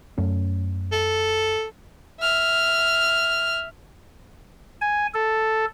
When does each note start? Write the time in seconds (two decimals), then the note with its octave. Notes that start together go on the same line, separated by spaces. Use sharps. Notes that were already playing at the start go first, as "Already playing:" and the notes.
0.18 F#2 A3 C#4
0.92 A4
2.20 E5 F6
4.81 G#5
5.14 A4